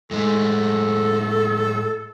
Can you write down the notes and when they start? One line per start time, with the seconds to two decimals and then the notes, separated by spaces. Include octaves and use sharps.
0.11 A2 G#3 A4